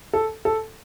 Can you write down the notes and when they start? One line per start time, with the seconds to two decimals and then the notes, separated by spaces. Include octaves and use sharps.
0.13 A4
0.45 A4